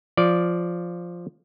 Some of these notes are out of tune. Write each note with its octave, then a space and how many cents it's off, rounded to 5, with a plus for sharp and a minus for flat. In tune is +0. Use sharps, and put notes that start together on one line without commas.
F3 +0 D5 -5